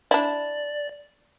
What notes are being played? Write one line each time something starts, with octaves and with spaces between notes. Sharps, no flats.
D4 E4 D5